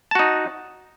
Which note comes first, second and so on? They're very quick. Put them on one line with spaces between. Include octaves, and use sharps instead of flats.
A5 F#4 D#4